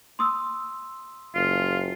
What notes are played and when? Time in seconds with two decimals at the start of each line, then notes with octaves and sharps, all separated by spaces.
0.19 C6 D#6 E6
1.35 F#1 F4